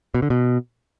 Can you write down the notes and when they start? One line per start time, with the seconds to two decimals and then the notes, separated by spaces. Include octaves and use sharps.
0.15 B2
0.22 D3
0.30 B2